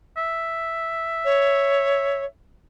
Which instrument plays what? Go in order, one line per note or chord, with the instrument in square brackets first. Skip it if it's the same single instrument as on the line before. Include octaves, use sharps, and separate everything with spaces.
[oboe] E5
[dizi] C#5